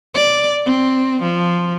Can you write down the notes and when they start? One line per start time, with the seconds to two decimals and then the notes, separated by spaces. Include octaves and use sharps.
0.15 D5
0.66 C4
1.22 F3